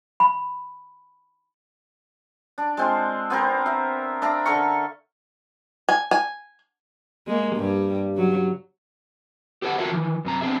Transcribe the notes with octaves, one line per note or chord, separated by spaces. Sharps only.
B5
D4
G#3 C4 F4
B3 C4 A#4
E5
D4 E5 F5 A#5
D3 A4 A#4 C#6
G#5
G#5
G#3 A#3
G2 G3
C#3 F#3
G4 A4 B4 C#5 F#5
F4 F#4 A4 A#4 C#5 E5
D#3 E3
F#2 C3 A#5
B3 C4 D4 G#4 E5